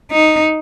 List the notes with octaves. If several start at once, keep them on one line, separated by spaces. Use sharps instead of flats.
D#4